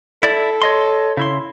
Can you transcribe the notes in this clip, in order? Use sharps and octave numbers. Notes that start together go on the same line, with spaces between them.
E4 A4 D5
C#5 D#5 C6
C#3 E4 C6